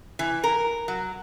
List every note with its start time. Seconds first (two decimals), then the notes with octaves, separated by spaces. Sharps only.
0.19 E3
0.44 A#4
0.88 F#3